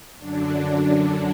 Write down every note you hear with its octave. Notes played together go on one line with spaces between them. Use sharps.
F#2 D3 F#3 D4
D4